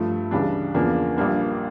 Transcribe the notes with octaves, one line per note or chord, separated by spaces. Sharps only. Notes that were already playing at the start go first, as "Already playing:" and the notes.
Already playing: G2 F3 A3
C#2 C#3 E3 G3 D4
E2 C#3 F3 A#3 D4
A#1 A#2 G3 A#3 D4